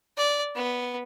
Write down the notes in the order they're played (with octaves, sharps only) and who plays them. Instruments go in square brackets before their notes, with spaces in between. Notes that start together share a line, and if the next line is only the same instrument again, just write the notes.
[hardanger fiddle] D5
B3